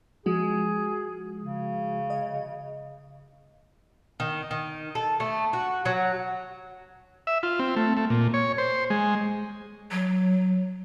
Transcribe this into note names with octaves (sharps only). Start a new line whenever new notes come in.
F3 G#3 F#4 G#4
C#3
D#5
D#3
D#3
A4
A3
F#4
F#3
E5
F4
C4
A3
A3
A#2
C#5
C5
G#3
F#3